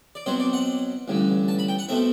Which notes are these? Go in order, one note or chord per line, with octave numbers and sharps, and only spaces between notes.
D5
B2 F#3 C4 C5
D5
F#5
A1 G2 D3
A5
B5
G5
F#5
B2 A3 C4 E5